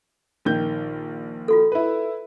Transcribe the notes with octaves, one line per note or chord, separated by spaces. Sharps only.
A#1 D#3 G6
F4 F#4 A4
E4 B4